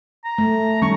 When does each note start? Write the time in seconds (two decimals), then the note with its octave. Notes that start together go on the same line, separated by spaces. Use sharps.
0.25 A#5
0.38 A3
0.82 D#3 G3 C#4 C#6